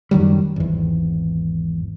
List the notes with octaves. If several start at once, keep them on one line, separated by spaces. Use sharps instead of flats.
F#2 D#3 F#3 G3
G#1 E2